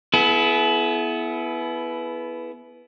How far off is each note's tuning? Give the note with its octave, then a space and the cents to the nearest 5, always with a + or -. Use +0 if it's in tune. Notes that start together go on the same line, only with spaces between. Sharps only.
B3 +0 E4 +10 G#4 +45